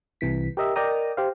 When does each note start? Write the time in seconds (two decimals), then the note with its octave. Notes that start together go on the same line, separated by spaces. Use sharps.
0.21 C2 C3 E3 B6
0.57 G4 A#4 D#5 E5
0.76 A#4 D5 D#5 G5 A#5 D#6
1.17 G4 C5 F5